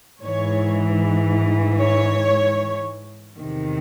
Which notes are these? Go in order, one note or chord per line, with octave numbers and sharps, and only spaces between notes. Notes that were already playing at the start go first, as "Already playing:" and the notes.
G#2 E3 C#5
C#5
E2 C3 D#3